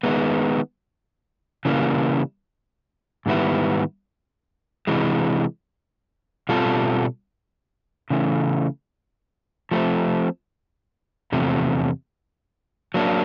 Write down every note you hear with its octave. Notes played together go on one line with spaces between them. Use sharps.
D#3 G#3 B3
C#3 E3 G3 A#3
G#2 D#3 G3 B3 E4
C3 E3 G#3
B2 G3 C4 F4 A4
C#3 E3 A3
F3 A3 C4
E2 C3 F3 A3
F#3 A#3 D4